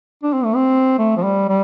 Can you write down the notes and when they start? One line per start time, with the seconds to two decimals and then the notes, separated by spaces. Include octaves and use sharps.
0.23 D4
0.33 C4
0.45 A3
0.55 C4
0.99 A3
1.17 F3
1.23 G3
1.49 G3